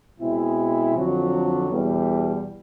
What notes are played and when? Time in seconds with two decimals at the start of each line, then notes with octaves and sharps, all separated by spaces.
0.20 B2 G#3 C4 E4
0.96 F2 D3 F#3
1.72 E2 B2 G3